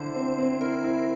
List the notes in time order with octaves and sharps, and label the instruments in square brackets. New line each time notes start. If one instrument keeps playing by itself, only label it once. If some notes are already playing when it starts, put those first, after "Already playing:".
Already playing: [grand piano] D3 E4 [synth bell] C5
[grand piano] C4
C4
[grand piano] E4 [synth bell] A#4
[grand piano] E4